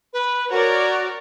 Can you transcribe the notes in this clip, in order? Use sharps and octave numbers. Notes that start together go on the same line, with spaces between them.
B4
F#4 A#4 C#5 D5